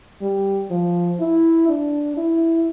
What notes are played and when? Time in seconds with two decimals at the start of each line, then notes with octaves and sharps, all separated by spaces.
0.22 G3
0.71 F3
1.20 E4
1.69 D4
2.17 E4